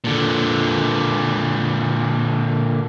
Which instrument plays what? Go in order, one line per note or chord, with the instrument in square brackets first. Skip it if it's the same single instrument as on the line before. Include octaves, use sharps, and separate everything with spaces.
[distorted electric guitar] A#2 D3